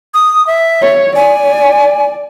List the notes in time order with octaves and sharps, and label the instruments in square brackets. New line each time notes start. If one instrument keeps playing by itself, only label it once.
[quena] D#6
E5
[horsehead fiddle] C#5
[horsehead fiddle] D5 [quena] G#5